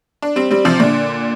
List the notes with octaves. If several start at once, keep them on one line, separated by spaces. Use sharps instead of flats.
D4
G3 C4
G3 C4
C3 F3
A#2 D3